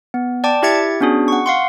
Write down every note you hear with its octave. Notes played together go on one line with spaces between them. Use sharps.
B3
D5 G5 A5 D6
E4 G4 E5 G#6 A6 C#7
B3 C#4 D4 F#4 G#4
F#5 C#6
F5 F#5 C6